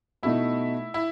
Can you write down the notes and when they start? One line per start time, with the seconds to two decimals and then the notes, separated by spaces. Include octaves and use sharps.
0.23 B2 A3 D#4 E4
0.94 E4